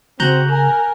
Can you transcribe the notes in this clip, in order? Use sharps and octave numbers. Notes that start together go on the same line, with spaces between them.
C#3 C4 F#4 A#5 F#6 G6
A#4 G#5